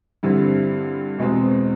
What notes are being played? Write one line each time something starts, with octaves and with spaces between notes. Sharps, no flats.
G2 D3 G3 C4 E4
E2 B2 G#3 C4